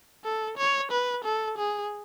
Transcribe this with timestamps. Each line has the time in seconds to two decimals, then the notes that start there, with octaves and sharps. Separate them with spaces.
0.24 A4
0.57 C#5
0.91 B4
1.24 A4
1.58 G#4